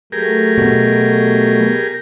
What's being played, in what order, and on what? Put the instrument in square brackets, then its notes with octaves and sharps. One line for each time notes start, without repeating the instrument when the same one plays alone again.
[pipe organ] F#3 A3 [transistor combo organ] G4 G#4 A#4
[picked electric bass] B2